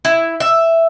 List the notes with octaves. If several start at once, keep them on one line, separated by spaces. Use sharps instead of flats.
E4
E5